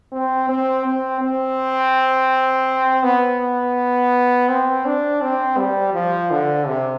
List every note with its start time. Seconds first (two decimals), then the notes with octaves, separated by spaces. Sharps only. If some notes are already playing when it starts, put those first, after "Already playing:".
0.12 C4
0.49 C4
0.85 C4
1.22 C4
3.03 B3
4.49 C4
4.85 D4
5.22 C4
5.57 G3
5.94 F3
6.31 D3
6.67 C3